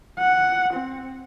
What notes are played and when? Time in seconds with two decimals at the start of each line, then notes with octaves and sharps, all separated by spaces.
0.19 F#5
0.73 C4